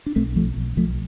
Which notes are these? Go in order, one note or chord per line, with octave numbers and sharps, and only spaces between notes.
D4
B1 A3 C4
B2 F3 A3
B1
B1 F3 A3